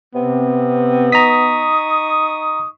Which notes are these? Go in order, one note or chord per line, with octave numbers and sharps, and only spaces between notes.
C3 B3 C4
D#4 A#5 C#6 D#6 B6